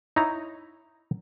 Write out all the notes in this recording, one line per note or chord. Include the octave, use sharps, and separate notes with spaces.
D#4 E4 C#5 A#5